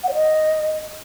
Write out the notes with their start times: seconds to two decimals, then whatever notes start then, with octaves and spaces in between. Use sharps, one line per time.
0.03 F#5
0.09 C#5
0.14 D#5